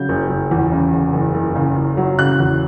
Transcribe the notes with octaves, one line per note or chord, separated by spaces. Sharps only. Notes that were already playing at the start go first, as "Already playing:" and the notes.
Already playing: C#3 F#3 G6
F#1
F#1
E2
C#3
C#3
F#1
F#1
C#3
F#1
F#3
C#3 F#6
E2